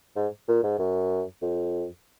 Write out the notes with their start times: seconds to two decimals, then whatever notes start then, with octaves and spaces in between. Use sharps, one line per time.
0.16 G#2
0.48 A#2
0.63 G#2
0.79 F#2
1.42 F2